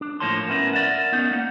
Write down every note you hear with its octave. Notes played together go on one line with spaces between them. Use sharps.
D4
A2 F3 A#3 C#5 A5 C6
B3 C#4 E4 A#4
A#4 D5 E5 F#5
B3 C#4 D#4
A#3 F#5